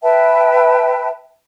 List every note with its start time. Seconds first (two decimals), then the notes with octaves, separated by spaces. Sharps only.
0.03 B4 E5 G5 A5